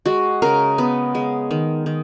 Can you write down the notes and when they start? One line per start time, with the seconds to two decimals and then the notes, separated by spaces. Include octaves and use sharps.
0.05 G#3 F#4
0.42 C#3 A#4
0.78 B3
1.15 G#3
1.51 D#3
1.86 D#3